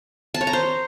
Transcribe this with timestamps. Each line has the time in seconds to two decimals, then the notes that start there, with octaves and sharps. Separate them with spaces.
0.34 A5
0.41 C#5
0.47 A#5
0.53 C5